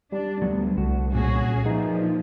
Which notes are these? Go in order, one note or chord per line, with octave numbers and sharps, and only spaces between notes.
G3 D4
D2 F#3 B3
C2 F#4
A#2 C#4 F#4 G#4
A#2 F3 D#4 G#4 B4 E5